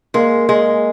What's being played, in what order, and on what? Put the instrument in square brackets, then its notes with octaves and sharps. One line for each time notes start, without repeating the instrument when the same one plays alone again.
[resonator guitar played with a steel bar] G#3 [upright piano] A#3
[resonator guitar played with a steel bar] G#3